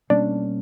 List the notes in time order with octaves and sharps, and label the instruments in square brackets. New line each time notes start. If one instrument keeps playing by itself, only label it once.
[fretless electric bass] B2 G3 A#3 C#4 [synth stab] D4